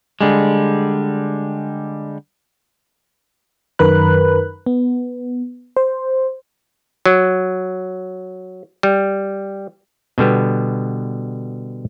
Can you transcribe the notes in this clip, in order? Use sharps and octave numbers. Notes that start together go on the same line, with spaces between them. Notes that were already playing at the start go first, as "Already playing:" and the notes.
D3 G3 G#3
F#2 D#3 A#4 B4 B5 F#6
B3
C5
F#3
G3
B2 D3 G3 B3